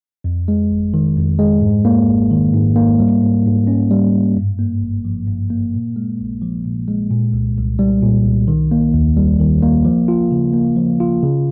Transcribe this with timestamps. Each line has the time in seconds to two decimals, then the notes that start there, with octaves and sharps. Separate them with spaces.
0.24 F2
0.48 G#3
0.71 G1
0.94 D#3
1.17 F2
1.39 G#3
1.62 G#2
1.85 A#3
2.09 G#1
2.31 D#3
2.54 G#2
2.76 A#3
2.99 G3
3.22 G#2
3.46 G#2
3.67 C#4
3.91 G3
4.13 G#2
4.36 G2
4.59 A#3
4.82 G1
5.05 F3
5.28 G2
5.50 A#3
5.74 A#2
5.96 G#3
6.20 A#1
6.42 F3
6.65 A#2
6.88 G#3
7.11 A#2
7.33 C2
7.57 C2
7.79 G3
8.02 A#2
8.25 C2
8.48 D#3
8.71 A#3
8.94 D#2
9.17 G3
9.40 D#3
9.62 A#3
9.85 F3
10.08 F4
10.31 C#3
10.53 A#3
10.76 F3
11.00 F4
11.23 C#3